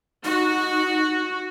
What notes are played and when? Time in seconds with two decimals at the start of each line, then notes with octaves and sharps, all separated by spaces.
0.24 D#4 F#4